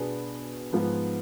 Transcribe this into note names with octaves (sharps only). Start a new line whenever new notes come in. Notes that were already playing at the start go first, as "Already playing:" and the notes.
Already playing: B2 B3 D4 G#4 B4
G#2 F3 B3